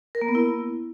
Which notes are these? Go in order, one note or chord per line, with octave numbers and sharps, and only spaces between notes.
A#4
A#3
B3
E4